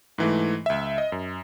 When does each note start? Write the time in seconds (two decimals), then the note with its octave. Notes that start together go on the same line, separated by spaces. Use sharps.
0.18 G#2 E3 A3
0.66 C#2 E5
0.98 D#5
1.12 F#2